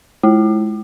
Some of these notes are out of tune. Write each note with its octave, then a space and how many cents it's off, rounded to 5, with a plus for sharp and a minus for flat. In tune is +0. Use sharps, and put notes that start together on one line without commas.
G#3 +30 E4 +0